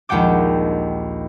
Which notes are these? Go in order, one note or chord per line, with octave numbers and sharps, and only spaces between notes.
A#1 D#2 G#3 F#5 G5 D6